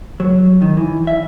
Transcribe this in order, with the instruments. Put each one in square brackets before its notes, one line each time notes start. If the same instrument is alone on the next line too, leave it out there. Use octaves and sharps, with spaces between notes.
[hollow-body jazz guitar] F#3
D#3
E3
E5